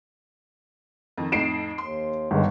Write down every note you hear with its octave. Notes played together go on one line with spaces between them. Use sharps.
F2 D#3
F2 A2 D#4 C7 D7 E7
D#2 C6
G1 G2 D#3 G#3